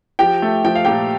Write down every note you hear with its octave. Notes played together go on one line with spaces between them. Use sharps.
F3 G4 G5
A3
F3 G5
F5
A#2 G4 G5